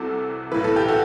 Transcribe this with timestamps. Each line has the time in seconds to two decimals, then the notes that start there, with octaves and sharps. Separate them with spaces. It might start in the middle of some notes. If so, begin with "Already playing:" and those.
Already playing: C2 C3 E3 F#4 A4
0.52 B1 A2 E3 B4
0.64 A4
0.76 G4
0.89 F#4 A4